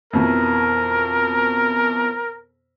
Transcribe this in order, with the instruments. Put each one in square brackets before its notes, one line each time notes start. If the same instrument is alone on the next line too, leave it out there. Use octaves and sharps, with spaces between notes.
[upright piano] F2 B2 E3 [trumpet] A#4